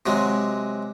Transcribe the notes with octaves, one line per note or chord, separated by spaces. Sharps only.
C3 F#3 G#3